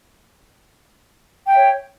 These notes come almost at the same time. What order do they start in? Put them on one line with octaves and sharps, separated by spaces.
G5 E5 C#5